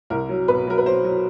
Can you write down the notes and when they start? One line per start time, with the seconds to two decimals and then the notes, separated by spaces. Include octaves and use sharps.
0.10 C2 A#4
0.29 F#3
0.48 B2 B4
0.67 F#3 A#4
0.78 B4
0.86 F#3 C5
1.05 F#3